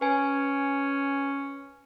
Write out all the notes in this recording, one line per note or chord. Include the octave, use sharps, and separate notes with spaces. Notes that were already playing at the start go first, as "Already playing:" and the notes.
C#4 B4 G#5